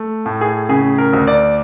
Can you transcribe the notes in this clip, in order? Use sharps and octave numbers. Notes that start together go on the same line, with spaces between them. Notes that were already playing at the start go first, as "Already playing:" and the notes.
Already playing: A3
A2
G#4
C#3 G#4
A#4
D2
D5